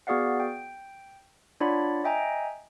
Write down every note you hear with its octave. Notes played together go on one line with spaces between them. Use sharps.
B3 F#4 G#4 D5 F5 F#5
G5
D4 F4 C#5 D5 F#5 B5
D#5 E5 G5 G#5 A#5